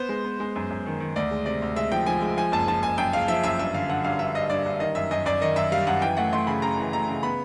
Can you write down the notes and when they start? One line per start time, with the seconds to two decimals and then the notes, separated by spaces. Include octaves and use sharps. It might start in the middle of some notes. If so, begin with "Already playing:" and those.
Already playing: B3 C5
0.09 G#3
0.24 B3
0.40 G#3
0.56 F#2
0.70 F#2
0.86 D#3
1.00 D#3
1.16 D2 D5
1.31 G#3
1.46 C3 D5
1.62 D2
1.76 G#3 E5
1.92 F3 G5
2.06 F3 G#5
2.22 G#3
2.37 F3 G#5
2.52 F#1 A5
2.67 F3 A5
2.83 F#1 G#5
2.98 F#2 G5
3.13 F#1 F5
3.28 F3 E5
3.43 F#2 E5
3.59 G2 E5
3.74 D3 F5
3.89 D3 F#5
4.05 G2 F5
4.19 G2 E5
4.35 G2 D#5
4.50 G2 D5
4.66 G2
4.80 D#3 D#5
4.95 F#2 E5
5.11 F#2 D#5
5.26 F#2 D5
5.41 D#3 D#5
5.56 F#2 E5
5.72 G3 F5
5.87 F#2 F#5
6.01 E3 G5
6.17 A3 F#5
6.33 A3 C6
6.47 C#3 B5
6.62 C#3 A#5
6.78 E3
6.93 A3 A#5
7.08 C#3
7.23 B3 B5